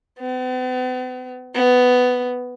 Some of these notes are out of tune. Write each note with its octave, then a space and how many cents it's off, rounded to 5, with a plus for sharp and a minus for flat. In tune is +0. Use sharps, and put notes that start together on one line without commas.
B3 +45
B3 +10